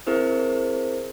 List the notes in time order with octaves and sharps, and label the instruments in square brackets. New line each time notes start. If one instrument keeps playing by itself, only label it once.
[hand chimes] C4 E4 G#4 A#4 C5